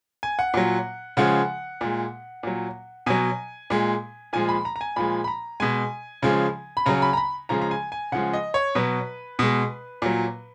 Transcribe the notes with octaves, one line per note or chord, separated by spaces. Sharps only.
G#5
F#5
A#2 F#3
C#3 F3 G#3 F#5
A#2 G#3
A#2 F#3
B2 F#3 G#5
A#2 G#3
A#2 F3 G#3 G#5
B5
A#5
A#5
G#5
A#2 F3 G#3 B5
B5
A#5
B2 G#3 G#5
C#3 F3 G#3
B5
C#3 F#3 A#5
B5
A#5
B5
C#3 F3 G#3 A#5
A#5
G#5
G#5
C#3 F3 G#3 F#5
D#5
C#5
B2 F#3 B4
B2 G#3
A#2 F#3